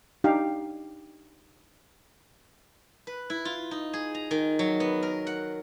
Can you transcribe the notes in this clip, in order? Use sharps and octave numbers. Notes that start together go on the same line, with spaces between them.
D4 D#4 G4 F5
B4
E4
F4
D#4
G#4
A#5
D#3
F#3
B3
A#4
F#5